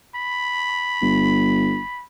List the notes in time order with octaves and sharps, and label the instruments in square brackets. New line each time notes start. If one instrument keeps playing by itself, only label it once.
[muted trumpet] B5
[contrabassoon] G1